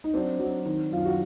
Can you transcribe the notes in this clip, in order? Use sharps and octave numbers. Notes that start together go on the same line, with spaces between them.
D#4
F#3 C4 D4
F#3
D#3
F#2 F4
F#4